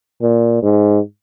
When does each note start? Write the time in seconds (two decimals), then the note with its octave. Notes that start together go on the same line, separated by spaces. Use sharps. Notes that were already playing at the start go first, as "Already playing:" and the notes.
0.22 A#2
0.62 G#2